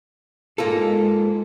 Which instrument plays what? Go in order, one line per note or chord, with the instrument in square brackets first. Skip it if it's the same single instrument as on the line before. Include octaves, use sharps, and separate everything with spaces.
[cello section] G#2 G#3 [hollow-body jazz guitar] A#3 F4 A4